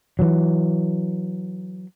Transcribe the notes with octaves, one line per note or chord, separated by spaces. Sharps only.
E3 F#3